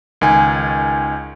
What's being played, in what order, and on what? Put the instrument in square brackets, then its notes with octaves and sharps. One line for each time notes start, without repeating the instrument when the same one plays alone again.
[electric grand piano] C#2 D#3 G#5